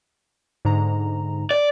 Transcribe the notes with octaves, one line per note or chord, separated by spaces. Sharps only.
G#2 D3 A#5
D5